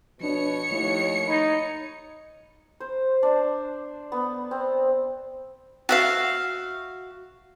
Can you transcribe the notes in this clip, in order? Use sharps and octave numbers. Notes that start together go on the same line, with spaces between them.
B2 F3 D4 C#5 C#7
D#2 F3 A3 E4
D#4 B5 G#6 A6
C5
D4
B3
C4
F#4 E5 F5